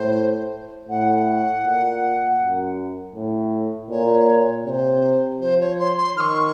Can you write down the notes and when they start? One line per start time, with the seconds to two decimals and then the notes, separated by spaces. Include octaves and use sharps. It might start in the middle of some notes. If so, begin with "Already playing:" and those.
Already playing: A2 C5
0.89 A2 F#5
1.65 A#2
2.40 F#2
3.15 A2
3.90 A#2 C#5
4.66 C3 C#5
4.70 C5
5.41 F3 C5
5.60 C#5
5.79 C6
5.97 C6
6.16 D#3 F6
6.20 C#6